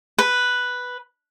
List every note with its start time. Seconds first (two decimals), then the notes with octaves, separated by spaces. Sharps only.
0.18 B4